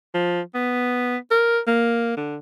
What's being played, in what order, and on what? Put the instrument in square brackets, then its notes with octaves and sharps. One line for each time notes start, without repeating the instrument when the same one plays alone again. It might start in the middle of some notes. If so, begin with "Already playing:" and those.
[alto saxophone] F3
B3
A#4
A#3
D3